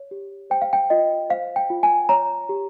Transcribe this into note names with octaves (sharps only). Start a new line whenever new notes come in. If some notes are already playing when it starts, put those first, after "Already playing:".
Already playing: C#5
G4
C5 G5
F5
G5
F4 D#5
C5 F5
G5
F4
G#5
C#5 A#5
G4